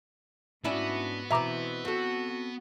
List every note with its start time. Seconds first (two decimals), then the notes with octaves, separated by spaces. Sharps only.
0.65 G#2 B3 C#4 D4 E4 F#4
1.31 B2 E3 C4 E5 A#5 D6
1.85 C4 F#4 A4